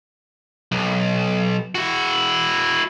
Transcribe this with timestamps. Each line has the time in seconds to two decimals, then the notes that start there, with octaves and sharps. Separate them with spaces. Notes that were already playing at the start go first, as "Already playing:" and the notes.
0.72 B1
1.75 E4 F#4